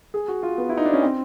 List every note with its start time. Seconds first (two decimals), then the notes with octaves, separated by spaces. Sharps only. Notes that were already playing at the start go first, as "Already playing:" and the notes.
0.14 G#4
0.28 F#4
0.43 F4
0.58 B3
0.69 E4
0.77 D#4
0.85 D4
0.94 C#4
1.02 C4